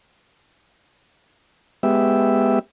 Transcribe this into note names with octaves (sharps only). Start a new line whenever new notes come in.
G#3 B3 G4 E5